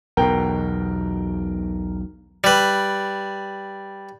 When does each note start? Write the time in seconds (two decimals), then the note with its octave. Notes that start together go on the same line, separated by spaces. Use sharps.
0.17 B1 E2 B2 A#4 G5
2.44 G3 B4